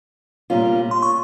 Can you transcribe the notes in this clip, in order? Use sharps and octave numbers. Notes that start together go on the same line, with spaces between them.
A#2 G3 C#4 F4
C6
C#6